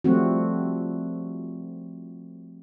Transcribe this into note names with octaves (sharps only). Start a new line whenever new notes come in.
F3 G3 A3 C4 F#4